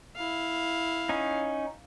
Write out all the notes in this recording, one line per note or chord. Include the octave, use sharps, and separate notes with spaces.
E4 F5
C#4 D#4